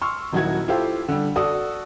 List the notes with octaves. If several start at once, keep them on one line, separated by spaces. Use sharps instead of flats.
C6 C#6 E6 F6
D#1 D#3 F#3 E4 F#4 G#6
E4 F4 G4 A4 C5 F5
D3 G3
F#4 A4 D5 D#6